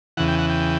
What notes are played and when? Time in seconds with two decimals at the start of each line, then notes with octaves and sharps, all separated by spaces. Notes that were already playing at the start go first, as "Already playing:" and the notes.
0.17 E2 C#3 E3 F#5
0.28 G5
0.38 F#5
0.49 G5